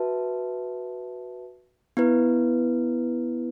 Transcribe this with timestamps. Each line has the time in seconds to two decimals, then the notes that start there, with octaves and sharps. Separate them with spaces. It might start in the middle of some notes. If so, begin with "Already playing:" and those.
Already playing: F#4 B4 E5 A5
1.97 B3 E4 B4